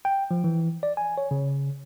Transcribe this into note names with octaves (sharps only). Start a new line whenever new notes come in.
G5
F3
E3
D5
G#5
C#5
C#3